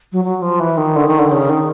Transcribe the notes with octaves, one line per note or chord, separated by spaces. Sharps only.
F#3
F#3
F3
E3
D#3
D3
D#3
D3
C#3
D#3